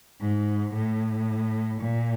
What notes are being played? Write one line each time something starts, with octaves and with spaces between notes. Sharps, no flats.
G#2
A2
A#2